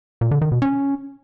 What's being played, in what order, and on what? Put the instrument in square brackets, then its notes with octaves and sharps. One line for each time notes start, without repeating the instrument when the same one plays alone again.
[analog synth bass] A#2
D3
D#3
B2
C#4